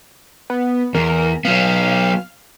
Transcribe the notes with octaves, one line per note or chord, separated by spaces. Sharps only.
B3
E2 A#4
F#3 B3 F5